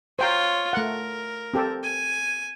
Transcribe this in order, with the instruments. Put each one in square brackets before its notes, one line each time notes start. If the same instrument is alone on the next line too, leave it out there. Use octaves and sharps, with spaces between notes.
[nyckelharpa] F4 C#5 [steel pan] C5 G5 A#5
[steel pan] A3 F#5 [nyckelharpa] A#4
[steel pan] C4 G4 A4
[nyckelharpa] G#5